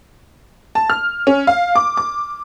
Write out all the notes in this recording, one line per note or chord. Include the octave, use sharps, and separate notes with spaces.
A5
F6
C#4
F5
D6
D6